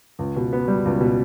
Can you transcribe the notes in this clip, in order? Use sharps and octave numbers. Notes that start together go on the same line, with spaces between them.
C#2
B2
B3
G3
C#2
B2